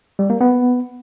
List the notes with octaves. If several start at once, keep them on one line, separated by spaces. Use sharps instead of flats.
G3
A#3
B3